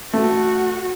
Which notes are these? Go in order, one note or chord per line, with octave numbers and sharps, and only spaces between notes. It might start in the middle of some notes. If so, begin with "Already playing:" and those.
A3 F#4